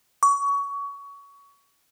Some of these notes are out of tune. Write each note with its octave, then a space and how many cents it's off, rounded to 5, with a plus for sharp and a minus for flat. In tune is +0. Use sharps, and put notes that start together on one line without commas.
C#6 +25